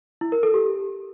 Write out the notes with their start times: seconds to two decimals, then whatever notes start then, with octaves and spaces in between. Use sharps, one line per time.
0.21 E4
0.32 A#4
0.43 A4
0.54 G4